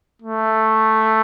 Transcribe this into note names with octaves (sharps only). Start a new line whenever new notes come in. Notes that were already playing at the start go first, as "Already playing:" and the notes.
A3